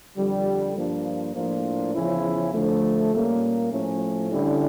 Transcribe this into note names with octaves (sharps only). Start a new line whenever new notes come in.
F2 D3 G3
G2 F3 A#3 D4 F4
A2 F3 A#3 D4 F4
E2 C#3 F3 C#4 E4
D3 F3 A3
A#2 G3 A#3 C#4
A2 F3 A3 C#4
D3 G3 C#4 E4